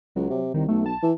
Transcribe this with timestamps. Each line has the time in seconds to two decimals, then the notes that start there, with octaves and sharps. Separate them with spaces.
0.16 C#2 F#3
0.30 C3
0.54 C2 D#3
0.68 B1 A3
0.86 A5
1.03 E3